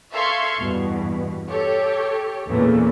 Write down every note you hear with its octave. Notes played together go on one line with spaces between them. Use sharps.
A4 E5 F5 C6 C#6 G#6
E2 G2 B2
G4 A4 C#5
E2 A#2 C#3 E3 A3 A#3